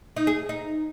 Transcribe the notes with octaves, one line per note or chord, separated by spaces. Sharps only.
D#4
G#4
D#4